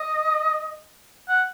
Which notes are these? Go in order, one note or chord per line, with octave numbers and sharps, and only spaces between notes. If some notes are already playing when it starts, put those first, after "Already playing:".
Already playing: D#5
F#5